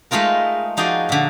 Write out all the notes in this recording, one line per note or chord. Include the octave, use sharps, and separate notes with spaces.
G#3 A3 D#4 F4 A#4
F3 D#4 F#4 G#4 D5
A#2 D3